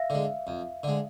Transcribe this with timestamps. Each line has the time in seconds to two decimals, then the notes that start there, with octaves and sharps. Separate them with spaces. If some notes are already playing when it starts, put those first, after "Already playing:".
Already playing: E5 F5
0.10 D3 G#3
0.47 F2
0.83 D3 G#3